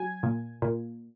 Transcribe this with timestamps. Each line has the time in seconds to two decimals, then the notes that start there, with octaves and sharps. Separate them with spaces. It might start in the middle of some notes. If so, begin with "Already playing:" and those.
Already playing: F#3 G#5
0.23 A#2
0.62 A#2